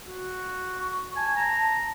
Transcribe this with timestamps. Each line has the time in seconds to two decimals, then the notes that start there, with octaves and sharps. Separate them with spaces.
0.07 F#4
0.78 C#6
1.16 G#5 A5
1.36 A#5